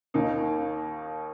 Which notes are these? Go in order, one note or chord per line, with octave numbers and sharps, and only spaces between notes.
D#2 D#3 A#3 D#4